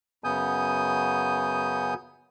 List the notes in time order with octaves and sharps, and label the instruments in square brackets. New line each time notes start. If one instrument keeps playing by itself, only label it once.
[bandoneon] F#2 C#3 B3 G#5 D#6 G6